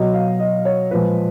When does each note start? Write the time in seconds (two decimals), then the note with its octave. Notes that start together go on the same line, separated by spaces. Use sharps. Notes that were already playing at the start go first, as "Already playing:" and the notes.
Already playing: B2 F#3 D#5
0.14 F5
0.39 D#5
0.65 C#5
0.91 A#2 F3 G#3 B4